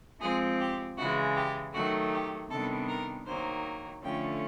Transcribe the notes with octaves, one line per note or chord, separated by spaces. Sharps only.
F3 G#3 C4 G#4
G4
C#3 E3 G#3 F#4
G4
D#3 F#3 A3 F#4
G4
C3 D#3 G3 B3 D4 A4
A#4
D#3 F#3 A#3 C5
D3 F3 A3 C#4 G5